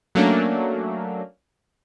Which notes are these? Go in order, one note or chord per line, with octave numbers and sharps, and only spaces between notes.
F#3 A3 A#3 C#4 D4